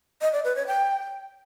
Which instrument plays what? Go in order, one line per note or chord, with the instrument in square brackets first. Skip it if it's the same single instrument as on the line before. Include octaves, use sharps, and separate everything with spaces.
[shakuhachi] D#5
D5
B4
C#5
G5